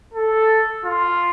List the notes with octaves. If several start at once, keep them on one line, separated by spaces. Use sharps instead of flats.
A4
F4